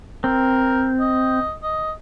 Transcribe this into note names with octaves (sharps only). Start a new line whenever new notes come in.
C4 A#4
D#5
D#5